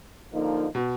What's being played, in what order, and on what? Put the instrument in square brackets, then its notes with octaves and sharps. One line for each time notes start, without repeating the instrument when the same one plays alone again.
[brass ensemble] D3 F3 A#3 D#4
[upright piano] B2